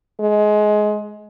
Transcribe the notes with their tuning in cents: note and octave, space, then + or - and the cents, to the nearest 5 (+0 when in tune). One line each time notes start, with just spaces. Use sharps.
G#3 +20